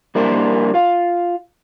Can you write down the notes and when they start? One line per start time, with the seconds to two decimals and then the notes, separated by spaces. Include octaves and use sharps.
0.15 G3 A#3 D4 E4 A#4 C5
0.74 F4 F5